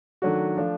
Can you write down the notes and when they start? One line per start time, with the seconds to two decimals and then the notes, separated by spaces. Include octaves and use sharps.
0.22 D#3 F#3 A3 D4 F#4
0.57 F3 A3 D4